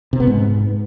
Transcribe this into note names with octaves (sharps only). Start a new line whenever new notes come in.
C3
B3
G#2